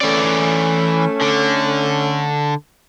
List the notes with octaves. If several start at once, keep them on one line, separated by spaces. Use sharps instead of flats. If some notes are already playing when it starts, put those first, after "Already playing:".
E3 A3 C#4 D5
D3